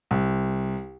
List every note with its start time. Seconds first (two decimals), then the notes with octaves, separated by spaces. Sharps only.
0.11 C2